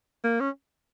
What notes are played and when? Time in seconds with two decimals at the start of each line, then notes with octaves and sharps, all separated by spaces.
0.24 A#3
0.40 C#4